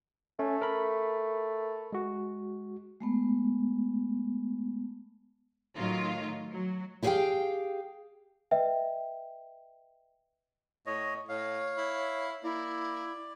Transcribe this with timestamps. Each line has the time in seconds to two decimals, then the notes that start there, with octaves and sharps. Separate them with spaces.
0.39 A3 C#4
0.62 A#4 B5
1.93 G#3 F#4
3.01 G#3 A3 B3
5.76 A2 D#3 F#3 F4
6.51 F#3
7.03 E4 G4 G#4 B4 F5 G5
8.51 B4 D#5 E5 G5
10.86 A2 C#5 D#5
11.29 A2 C#5 F5
11.78 E4
12.44 A#3 E4 D5